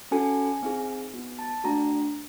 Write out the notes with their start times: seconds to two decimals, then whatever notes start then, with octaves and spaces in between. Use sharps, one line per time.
0.11 C#4 F#4 A4 G#5
0.63 C4 D#4 G#4
1.14 B3 D#4 F#4
1.39 A5
1.64 A3 D4 F#4 A#5